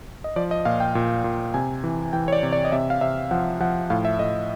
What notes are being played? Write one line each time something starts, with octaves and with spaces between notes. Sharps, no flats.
D#5
F3 D5
D#5
A#2 F5
G5
A#2
A#2
C3 G#5
E3
E3 G5
C#5
D5
C3
D5
D#5
C3 E5
F5
C3 E5
F3 F#5
F3 F#5
A2 F5
E5
A2 D#5